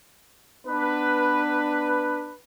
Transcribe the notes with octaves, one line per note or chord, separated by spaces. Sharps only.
B3 D4 B4